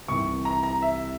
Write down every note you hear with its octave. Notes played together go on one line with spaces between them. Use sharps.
C2 C3 E3 C#6
A#5
A#5
E5